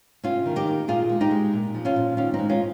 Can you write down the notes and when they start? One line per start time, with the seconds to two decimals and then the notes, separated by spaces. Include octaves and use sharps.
0.24 C3 C#4 F4
0.46 D#3
0.56 D#4 G4
0.68 A#3
0.88 A#2 F4 G#4
1.09 G#3
1.21 D#4 G4
1.31 G#3
1.53 A#2
1.74 F3
1.85 C#4 F4
1.96 A#2
2.17 D#3 C#4 F4
2.34 G#3 C4 D#4
2.49 C#4 F4